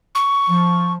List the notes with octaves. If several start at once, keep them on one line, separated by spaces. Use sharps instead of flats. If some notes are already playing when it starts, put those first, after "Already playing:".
C#6
F3